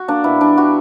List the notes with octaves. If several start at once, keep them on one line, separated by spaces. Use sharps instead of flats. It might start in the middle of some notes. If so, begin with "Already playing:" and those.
Already playing: F#4
A#3 D4
B2 E4
G3 D4
G3 F#4